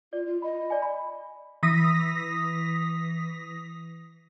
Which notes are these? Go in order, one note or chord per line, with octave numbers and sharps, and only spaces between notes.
F4 D5
F4
D#5 B5
D5 G#5
B5
E3 D#6 A#6 B6